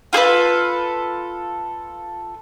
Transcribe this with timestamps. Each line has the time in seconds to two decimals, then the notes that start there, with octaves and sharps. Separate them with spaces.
0.13 F4 G#4 A4 B4